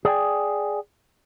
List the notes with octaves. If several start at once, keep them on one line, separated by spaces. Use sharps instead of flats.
G#4 D5 G5 G#5